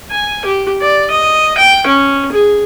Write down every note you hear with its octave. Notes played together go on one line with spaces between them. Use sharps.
G#5
G4
D5
D#5
G5
C#4
G#4